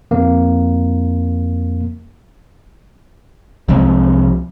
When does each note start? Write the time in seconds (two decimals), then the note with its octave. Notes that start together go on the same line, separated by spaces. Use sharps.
0.11 F2 A#3
3.68 C2 F3 G#3 C4